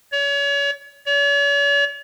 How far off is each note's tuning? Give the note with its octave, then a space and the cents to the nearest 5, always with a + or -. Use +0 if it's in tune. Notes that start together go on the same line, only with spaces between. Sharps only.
C#5 +35
C#5 +45